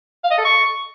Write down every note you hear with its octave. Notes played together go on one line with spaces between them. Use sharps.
F5
D#5
A4
C#6